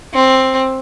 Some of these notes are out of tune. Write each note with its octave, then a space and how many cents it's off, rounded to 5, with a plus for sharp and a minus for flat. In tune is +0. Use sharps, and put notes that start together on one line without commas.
C4 +10